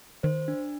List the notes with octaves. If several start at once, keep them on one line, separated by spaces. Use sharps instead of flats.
D#3 C5
D4